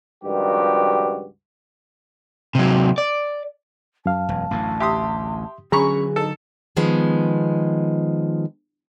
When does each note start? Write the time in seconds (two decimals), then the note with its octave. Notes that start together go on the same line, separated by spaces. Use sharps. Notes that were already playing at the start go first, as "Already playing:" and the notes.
0.24 C#2 G2 D#3 F3 F#4 G4
2.55 C3 F#3
2.98 D5
4.06 F#2 F5 A5
4.29 E1
4.51 A1 D2 A2
4.80 G4 E5 C6 D#6
5.72 D3 F#3 C#4 G#4 A#5 B5 C#6
6.16 D#4 A4
6.76 D#3 F3 G#3 B3